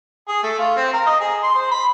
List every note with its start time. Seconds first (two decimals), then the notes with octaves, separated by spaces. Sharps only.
0.28 G#4
0.43 A3
0.59 F4
0.76 C4
0.93 A#4
1.06 D#5
1.20 G#4
1.43 C6
1.55 C5
1.71 B5